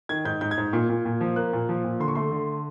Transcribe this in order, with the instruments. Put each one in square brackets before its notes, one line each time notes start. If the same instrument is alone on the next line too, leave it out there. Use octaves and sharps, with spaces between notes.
[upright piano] D#3 G#6
G#2 G6
G#2 G6
G#6
G#2
A#2
A#2
A#2
F3
A#3 F#6
A#2
F3
A#2
D3 C6
C#6
A3 C6
D3